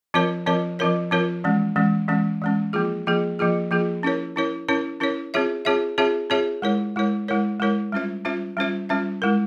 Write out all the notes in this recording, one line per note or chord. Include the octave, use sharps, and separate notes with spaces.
F3 C4 F4 A#4 C#5
F3 C4 F4 A#4 C#5
F3 C4 F4 A#4 C#5
F3 C4 F4 A#4 C#5
E3 G#3 C#4
E3 G#3 C#4
E3 G#3 C#4
E3 G#3 C#4
F3 A#3 F4 G#4
F3 A#3 F4 G#4
F3 A#3 F4 G#4
F3 A#3 F4 G#4
C#4 E4 A#4 C#5
C#4 E4 A#4 C#5
C#4 E4 A#4 C#5
C#4 E4 A#4 C#5
C4 F4 G#4 C#5 E5
C4 F4 G#4 C#5 E5
C4 F4 G#4 C#5 E5
C4 F4 G#4 C#5 E5
G#3 E4 A#4 C#5
G#3 E4 A#4 C#5
G#3 E4 A#4 C#5
G#3 E4 A#4 C#5
G3 C#4 F4 C5 E5
G3 C#4 F4 C5 E5
G3 C#4 F4 C5 E5
G3 C#4 F4 C5 E5
G#3 E4 A#4